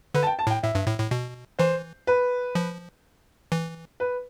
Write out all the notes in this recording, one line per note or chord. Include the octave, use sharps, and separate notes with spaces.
D3 B4
A5
G5
A5
A2 G5
A2 E5
G2
A2
A2
B2
E3 C5
B4
F3
E3
B4